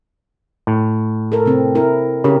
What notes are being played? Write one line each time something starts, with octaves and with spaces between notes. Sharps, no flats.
A2
A4 A#4
C3 C4
E4 A#4
C#3 G4 A#4